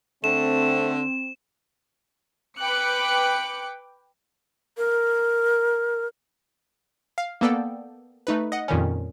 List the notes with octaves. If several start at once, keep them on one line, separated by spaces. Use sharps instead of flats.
D3 A3 C4 E7
B4 G5 D6 F#6 C#7
A#4
F5
A#3 B3 A4 D5 G5
A3 D#4 B4
D#5 F#5
F2 A#2 D#3 G3 C#4